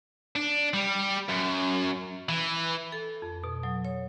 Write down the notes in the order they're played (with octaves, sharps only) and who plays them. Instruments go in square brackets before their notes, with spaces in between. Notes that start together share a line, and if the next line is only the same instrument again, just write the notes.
[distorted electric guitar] D4
G3
F#2
E3
[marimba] A4
F2
B2
F#3
C#5